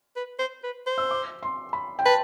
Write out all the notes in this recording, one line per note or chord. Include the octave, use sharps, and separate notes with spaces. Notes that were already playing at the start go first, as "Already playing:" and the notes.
B4
C5
B4
C5
E6
D6
C6
B5
G5
B4 A5